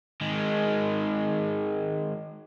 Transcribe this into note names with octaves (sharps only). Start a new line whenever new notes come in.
D#3 G#3